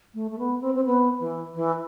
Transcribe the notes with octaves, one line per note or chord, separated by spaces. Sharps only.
A3
A3
B3
C4
C4
B3
E3
E3